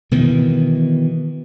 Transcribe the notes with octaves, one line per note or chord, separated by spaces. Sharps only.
B2 D#3 E3